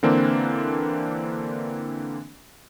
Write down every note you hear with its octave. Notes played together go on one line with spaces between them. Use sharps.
D3 E3 A#3 C4 D4